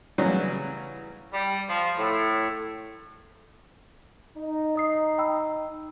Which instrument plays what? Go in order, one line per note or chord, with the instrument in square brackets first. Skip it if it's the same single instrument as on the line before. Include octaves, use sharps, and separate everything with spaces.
[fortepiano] C#3 E3 F#3 G3 C#4
[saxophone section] G3
F3
A2
[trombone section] D#4
[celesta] D#5 D#6 C7
G5 B5 E6